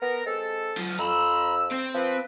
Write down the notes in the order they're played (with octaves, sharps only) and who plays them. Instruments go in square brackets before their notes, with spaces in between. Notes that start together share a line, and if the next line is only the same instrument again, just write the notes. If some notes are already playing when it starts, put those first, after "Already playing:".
[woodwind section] B3 A#4
G#3 C4 A4
[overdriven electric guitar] F#3 F4
[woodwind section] F2 E6 [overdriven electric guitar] A#5 B5
[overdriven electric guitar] C4 C5
[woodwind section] F3 B4